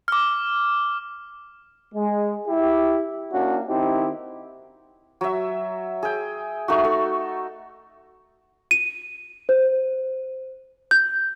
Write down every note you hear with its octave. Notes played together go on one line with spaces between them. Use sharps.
D6 F6
G#3
E4 G4
A#3 C#4 D4 E4 F#4
D#3 C4 D#4 E4 G4
F#3 E5
G#4 G5
A3 D#4 F#4
A4
D#7
C5
G6